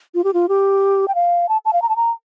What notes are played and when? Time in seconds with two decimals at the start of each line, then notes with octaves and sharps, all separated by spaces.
0.15 F4
0.24 G4
0.34 F4
0.49 G4
1.08 G5
1.15 F5
1.49 A5
1.65 A5
1.73 F5
1.82 A#5
1.89 A5
1.96 A#5